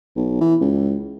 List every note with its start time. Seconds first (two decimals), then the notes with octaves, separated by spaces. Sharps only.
0.16 B1
0.41 E3
0.60 C#2